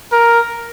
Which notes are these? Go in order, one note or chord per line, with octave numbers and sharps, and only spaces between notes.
A#4